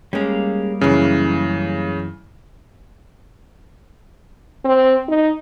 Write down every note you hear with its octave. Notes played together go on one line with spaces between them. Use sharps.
G3 G#3 A#3 C#4 F5
F#2 C#3 E3
C4
D#4